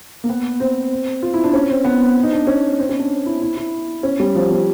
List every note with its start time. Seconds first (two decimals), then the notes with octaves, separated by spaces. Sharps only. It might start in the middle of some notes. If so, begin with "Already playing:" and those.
0.24 A#3
0.29 B3
0.60 C4
1.22 F4
1.33 E4
1.44 D4
1.53 C#4
1.70 C4
1.84 B3
2.23 D#4
2.32 D4
2.47 C#4
2.79 C4
2.89 C#4
2.99 D4
3.26 E4
3.41 E4
3.57 E4
4.03 C#4
4.20 G3
4.35 F3
4.50 F3